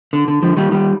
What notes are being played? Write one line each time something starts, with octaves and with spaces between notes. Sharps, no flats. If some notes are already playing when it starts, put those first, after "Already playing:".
D3
D3
D3 F3
D#3 G3
D#3 G3